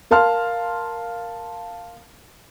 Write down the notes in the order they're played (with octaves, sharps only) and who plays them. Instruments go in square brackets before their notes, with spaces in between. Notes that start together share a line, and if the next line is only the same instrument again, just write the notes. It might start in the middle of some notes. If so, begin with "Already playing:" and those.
[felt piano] A#4 F5 A5 C6 F6